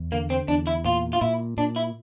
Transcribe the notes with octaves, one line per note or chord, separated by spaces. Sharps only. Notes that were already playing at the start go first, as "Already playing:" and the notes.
Already playing: E2
D3 A#3
C4
E2 D4
E4
A#2 F4
F4
A#2 E4
A#2 D4
E4